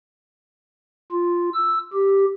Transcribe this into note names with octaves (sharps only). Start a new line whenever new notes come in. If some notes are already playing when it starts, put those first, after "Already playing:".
F4
E6
G4